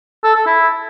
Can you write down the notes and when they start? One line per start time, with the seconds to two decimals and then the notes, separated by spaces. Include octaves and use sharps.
0.24 A4
0.35 A4
0.46 E4